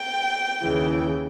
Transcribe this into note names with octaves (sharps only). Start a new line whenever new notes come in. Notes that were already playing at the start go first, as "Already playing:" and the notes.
Already playing: G5
D#2 C#3 E3